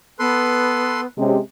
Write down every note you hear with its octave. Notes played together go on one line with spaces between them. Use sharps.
B3 A4 B4 C6
C3 G#3 C#4